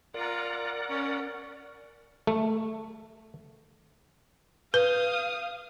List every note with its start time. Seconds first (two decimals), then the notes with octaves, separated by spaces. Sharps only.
0.14 F4 A#4 D5 F#5 A#5
0.89 C#4
2.27 A3
4.74 B4 F5 D#6